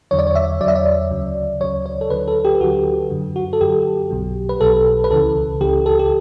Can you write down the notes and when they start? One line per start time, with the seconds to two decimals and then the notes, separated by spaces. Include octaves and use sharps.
0.11 E2 D3 F#3 C#5
0.19 D5
0.27 C#5
0.35 E5
0.60 E2 D3 F#3 D5
0.68 E5
0.75 D5
1.11 D2 C#3 F#3
1.60 D2 C#3 F#3 C#5
1.86 C#5
2.01 A4
2.10 D2 D3 F#3 B4
2.28 A4
2.45 G4
2.55 G4
2.60 D2 D3 F#3 F#4
3.10 F#2 D3 F#3
3.36 F#4
3.53 A4
3.61 F#2 D3 F#3 G4
4.11 B1 B2 F#3
4.49 B4
4.61 B1 B2 F#3 A4
5.04 B4
5.10 C#2 C#3 E3 A4
5.61 C#2 C#3 E3 G4
5.86 A4
5.99 G4